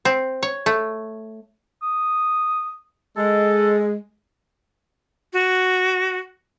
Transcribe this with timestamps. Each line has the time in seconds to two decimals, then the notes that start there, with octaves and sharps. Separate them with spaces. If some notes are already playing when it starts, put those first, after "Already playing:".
0.05 C4
0.43 C#5
0.66 A3
1.82 D#6
3.17 G#3 A4
5.33 F#4